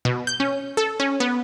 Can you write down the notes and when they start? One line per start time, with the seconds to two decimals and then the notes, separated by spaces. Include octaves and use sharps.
0.05 B2
0.27 G6
0.40 C#4
0.77 A4
1.00 C#4
1.20 B3